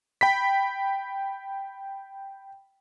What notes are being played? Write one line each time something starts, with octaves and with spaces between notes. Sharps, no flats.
G5 B5 B6